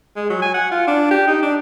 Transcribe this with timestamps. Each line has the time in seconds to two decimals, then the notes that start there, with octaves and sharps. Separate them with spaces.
0.16 G#3
0.30 F#3
0.42 G#5
0.54 F#5
0.71 F4
0.87 D4
1.11 G4
1.27 D#4
1.43 D4